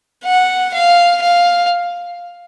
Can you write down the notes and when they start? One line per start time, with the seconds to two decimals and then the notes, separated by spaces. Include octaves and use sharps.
0.24 F#5
0.73 F5
1.23 F5